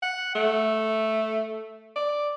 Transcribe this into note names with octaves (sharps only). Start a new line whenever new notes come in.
F#5
A3
D5